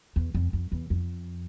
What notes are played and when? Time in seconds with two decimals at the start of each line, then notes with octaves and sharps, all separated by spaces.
0.16 E2
0.34 F2
0.53 F2
0.72 E2
0.90 F2